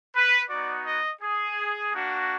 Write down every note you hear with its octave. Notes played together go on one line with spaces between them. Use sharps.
B4
B3 D#4 F#4 D5
D#5
G#4
A#3 D4 F#4